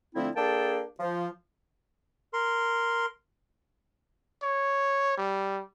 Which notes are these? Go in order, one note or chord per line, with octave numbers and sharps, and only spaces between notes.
D3 F3 A3 C4 E4
A#3 D4 G#4 A4 G5 A5
F3
A#4 C6
C#5
G3